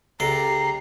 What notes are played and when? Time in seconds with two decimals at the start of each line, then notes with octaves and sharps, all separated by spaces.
0.20 C#2 G4 A4 A#5 C7